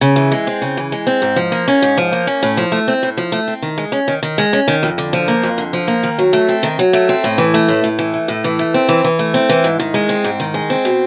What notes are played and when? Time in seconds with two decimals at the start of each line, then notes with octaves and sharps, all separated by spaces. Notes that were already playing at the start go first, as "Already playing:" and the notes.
0.01 C#3
0.16 E3
0.32 G#3
0.47 C4
0.62 C#3
0.77 E3
0.92 G#3
1.07 C4
1.22 G#2
1.36 F3
1.52 A#3
1.68 C#4
1.82 G#2
1.97 F3
2.12 A#3
2.27 C#4
2.43 A2
2.57 F3
2.72 A3
2.88 C4
3.03 A2
3.17 F3
3.32 A3
3.48 C4
3.62 D#3
3.78 G#3
3.92 C#4
4.08 D#3
4.23 D#3
4.38 G#3
4.53 C#4
4.68 D#3
4.83 F2
4.98 D3
5.13 F3
5.28 A#3
5.43 F2
5.58 D3
5.73 F3
5.88 A#3
6.03 D#3
6.19 F#3
6.33 A3
6.48 C4
6.63 D#3
6.79 F#3
6.93 A3
7.09 C4
7.24 A2
7.38 E3
7.54 A3
7.68 A2
7.84 A2
7.99 E3
8.14 A3
8.28 A2
8.44 E3
8.59 A3
8.74 C4
8.89 E3
9.04 E3
9.19 A3
9.34 C4
9.49 E3
9.64 G#2
9.80 D#3
9.94 G#3
10.09 C4
10.24 G#2
10.40 D#3
10.54 G#3
10.70 C4
10.85 B2